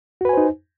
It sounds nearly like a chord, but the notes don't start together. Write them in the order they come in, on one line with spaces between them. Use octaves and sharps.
F#4 B4 G#5 C5 D#4